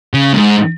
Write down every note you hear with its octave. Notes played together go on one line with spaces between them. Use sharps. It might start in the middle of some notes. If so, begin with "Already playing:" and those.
C#3
G#2